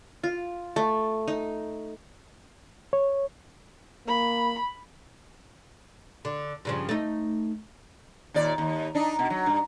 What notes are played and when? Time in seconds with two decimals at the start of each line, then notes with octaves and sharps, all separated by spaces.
0.24 F4
0.76 A3
1.28 D#4
2.93 C#5
4.08 A#3 B5
6.25 D3
6.65 G2 C#3 F3
6.89 A3 D#4
8.34 D#2 A#2 D5
8.58 D#2
8.95 D4 D#4
9.19 B2
9.30 F#3
9.46 G2